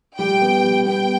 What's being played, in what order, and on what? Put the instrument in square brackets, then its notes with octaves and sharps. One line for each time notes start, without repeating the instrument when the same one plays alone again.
[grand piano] G3 [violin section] G5
[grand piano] B3
G3
[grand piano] B3 [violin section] G5